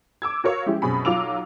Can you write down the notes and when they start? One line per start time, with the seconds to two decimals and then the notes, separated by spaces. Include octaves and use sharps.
0.22 D6 E6 G#6
0.44 F#4 A#4 C#5 F5
0.66 F3 G#3 C#4 E4 G4
0.82 F#2 B2 C4 G#4 B5
1.05 B1 F#3 F4 D6 E6 F7